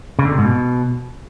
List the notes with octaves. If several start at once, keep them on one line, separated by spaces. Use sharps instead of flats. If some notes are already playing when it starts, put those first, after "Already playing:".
C#3
D3
C3
G#2
B2